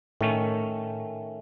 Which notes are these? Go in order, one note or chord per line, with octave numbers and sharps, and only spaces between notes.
A2 D#3 A3 C#4